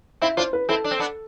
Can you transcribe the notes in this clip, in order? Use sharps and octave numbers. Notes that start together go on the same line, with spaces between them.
C4 E4 E5
D4 F4 C5
B4
C4 E4 A4
D4
C4
B3 D4